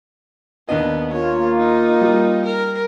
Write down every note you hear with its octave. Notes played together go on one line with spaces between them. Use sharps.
D#2 B3 D4 D#5
A#3 F4 C#5
D#4
G3
A#4